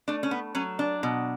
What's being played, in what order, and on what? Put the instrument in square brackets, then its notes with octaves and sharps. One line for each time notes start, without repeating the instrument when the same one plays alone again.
[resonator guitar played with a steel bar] A3 D4
C#4
B3
F#3 C#4
D4
B2